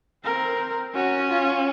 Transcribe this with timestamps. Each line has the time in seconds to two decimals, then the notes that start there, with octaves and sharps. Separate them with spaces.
0.24 C4 A#4
0.95 C#4 F#4
1.30 F4